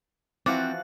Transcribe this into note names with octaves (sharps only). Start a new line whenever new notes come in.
E3 F3 C4 F#4 F5 D6 F#6 A6